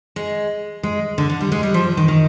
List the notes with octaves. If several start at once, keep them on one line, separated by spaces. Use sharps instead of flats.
G#3
G#3
D3
D3
G3
G#3
G3
F3
D#3
D#3